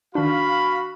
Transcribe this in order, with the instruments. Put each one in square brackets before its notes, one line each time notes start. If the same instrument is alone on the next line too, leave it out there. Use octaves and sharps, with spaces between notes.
[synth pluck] D#3 D4 [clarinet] F#4 [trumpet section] F5 B5